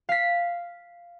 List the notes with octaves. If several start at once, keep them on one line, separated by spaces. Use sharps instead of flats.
F5 B6